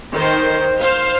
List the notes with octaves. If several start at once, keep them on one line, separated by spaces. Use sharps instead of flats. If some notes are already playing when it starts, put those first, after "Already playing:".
D#3 C5
C5 F5